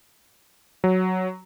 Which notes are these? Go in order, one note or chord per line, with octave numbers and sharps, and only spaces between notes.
F#3